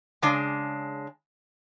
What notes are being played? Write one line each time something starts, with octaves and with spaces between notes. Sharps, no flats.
C#3 G#3 D4